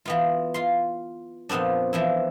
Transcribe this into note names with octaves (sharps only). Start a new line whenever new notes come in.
E3 B3 F4
F4 C6
F2 A#2 B3 C4 D4
E3 F3 E4